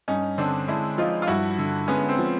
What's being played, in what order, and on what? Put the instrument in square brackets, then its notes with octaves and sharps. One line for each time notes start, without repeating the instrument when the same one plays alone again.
[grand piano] G2 [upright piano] C#4 D#4
[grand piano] D3 [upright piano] C4 D4
[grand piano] G#3 [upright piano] D4 E4
[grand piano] F3 [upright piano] D#4 F4
[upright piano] F4
[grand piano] G2 [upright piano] E4 F#4
[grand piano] D3
[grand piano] G#3 [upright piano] B3 C#4
[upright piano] C4
[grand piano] F3